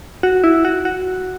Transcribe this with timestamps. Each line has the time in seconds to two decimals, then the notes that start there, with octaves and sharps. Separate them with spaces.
0.23 F#4
0.44 E4
0.65 F#4
0.85 F#4